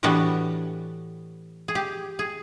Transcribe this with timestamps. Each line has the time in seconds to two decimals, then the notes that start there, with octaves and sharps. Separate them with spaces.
0.03 A2 E3 G3 B3 D4 F#4
1.68 G#4
1.75 G4
2.19 G#4